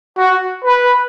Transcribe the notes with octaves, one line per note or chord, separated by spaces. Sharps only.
F#4
B4